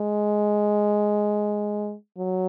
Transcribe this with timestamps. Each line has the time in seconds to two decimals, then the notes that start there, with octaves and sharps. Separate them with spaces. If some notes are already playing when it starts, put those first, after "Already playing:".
Already playing: G#3
2.18 F#3